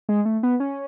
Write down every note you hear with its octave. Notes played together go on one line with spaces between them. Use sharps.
G#3
A3
B3
C#4